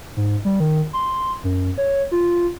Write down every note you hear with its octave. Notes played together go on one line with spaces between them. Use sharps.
G#2
G3
D#3
C6
F#2
C#5
F4